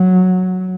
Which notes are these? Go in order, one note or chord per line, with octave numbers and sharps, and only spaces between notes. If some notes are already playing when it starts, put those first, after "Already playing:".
Already playing: F#3